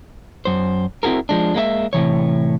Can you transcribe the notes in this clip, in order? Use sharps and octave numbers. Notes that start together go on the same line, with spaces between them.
F#2 C5
C4 E4 F#4 G#4 A#4
F3 G#3 D4
G#3 A#3 D#4 E5
A2 C3 E3 C#5